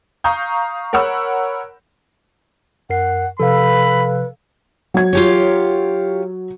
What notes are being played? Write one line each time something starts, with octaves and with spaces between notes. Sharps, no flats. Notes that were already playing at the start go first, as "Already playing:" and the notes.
F5 A#5 C#6 D#6 G6
A#4 C#5 F#5 B5 E6
F#2 A#4 F#5 C7
C3 F3 A4 B4 F5 B5
F#3 G#6
F4 G4 C#5